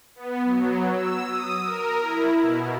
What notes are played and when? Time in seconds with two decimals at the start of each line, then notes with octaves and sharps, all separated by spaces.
0.16 B3
0.44 F#3
0.91 E6
1.29 D#6
1.63 A#4
2.02 E4
2.40 B2